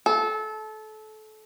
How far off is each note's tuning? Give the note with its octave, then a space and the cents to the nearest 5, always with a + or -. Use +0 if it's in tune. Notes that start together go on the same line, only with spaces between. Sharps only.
A4 -25